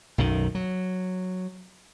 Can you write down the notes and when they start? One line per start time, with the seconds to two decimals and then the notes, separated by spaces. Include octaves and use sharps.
0.18 B1 F#2 D#3
0.55 F#3